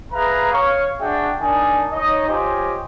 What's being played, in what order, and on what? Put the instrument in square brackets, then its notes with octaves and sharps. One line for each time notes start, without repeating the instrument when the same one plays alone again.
[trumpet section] G#4 B4 E5 F5 A#5
C#5 F5 C#6
D4 F#4 G#4 D5 E5 G5
D4 D#4 A#4 G#5
D#4 C#5 D#5
F4 G4 C5 C#5 D#5 G#5